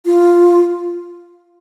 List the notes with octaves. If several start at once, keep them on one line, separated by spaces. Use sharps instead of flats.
F4